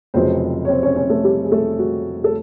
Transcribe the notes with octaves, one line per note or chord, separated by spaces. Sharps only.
F1 F2 C#3 F#3 C4 C5
C#5
C4 C5
C#4 C#5
C#4 C#5
A3 A4
G3 G4
G#4
A3 A4
F#4
A4